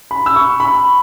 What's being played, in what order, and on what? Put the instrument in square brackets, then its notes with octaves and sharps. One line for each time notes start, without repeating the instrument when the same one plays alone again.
[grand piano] B5
E6
C#6
B5